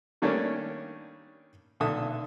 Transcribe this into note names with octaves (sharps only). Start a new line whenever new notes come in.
D#3 G3 A3 A#3 C#4 D4
B1 A#2 D3 A4 E5 D#6